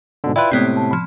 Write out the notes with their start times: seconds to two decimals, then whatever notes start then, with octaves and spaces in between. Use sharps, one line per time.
0.24 G#2 B2 D3
0.36 E4 F4 B4 D5 G5
0.51 A2 C3 G#3 B3 C4
0.77 A5
0.91 F3 B5